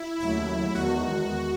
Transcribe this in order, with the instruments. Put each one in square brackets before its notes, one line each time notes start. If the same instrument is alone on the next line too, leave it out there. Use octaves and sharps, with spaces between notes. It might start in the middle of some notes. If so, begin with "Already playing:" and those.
Already playing: [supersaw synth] E4
[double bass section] D#2 C#3 F#3 A3 [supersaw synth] E4
[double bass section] E2 D#3 G#3 [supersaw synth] F#4